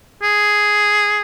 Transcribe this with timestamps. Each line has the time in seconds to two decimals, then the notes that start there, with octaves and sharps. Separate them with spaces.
0.23 G#4